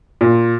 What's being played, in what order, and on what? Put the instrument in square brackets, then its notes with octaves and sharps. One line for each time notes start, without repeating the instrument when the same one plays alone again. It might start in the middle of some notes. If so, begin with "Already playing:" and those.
[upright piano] A#2